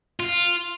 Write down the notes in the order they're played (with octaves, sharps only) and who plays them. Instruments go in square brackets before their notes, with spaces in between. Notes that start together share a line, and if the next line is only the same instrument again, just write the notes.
[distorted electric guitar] F4